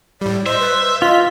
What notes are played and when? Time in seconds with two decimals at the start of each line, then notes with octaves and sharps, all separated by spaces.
0.21 A2 G3 D5
0.46 C5 D#5 E5
0.59 B4
1.02 F4 D#5 B6